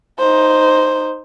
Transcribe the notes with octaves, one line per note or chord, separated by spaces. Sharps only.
D#4 C5